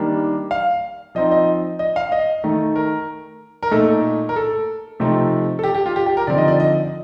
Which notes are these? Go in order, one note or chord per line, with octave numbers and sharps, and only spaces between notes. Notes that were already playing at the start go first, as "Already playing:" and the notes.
Already playing: D#3 G3 A#3 D4
F5
F3 C4 D#4 D#5
D#5
D#5
F5
D#5
D#3 A3 D#4
A#4
A#4
A#2 A3 D#4 A4
A#4
A4
C3 F3 A3 C4 D#4
A4
G4
G4
F4
G4
G4
A#4
D3 F3 C4 D#4 D5
D#5
D5
D#5